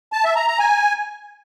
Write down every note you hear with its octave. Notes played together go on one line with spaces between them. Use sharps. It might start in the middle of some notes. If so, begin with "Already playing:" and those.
A5
E5
A#5
A#5
G#5